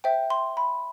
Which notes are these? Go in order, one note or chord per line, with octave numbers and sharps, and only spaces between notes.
C5 E5 G5
C6
B5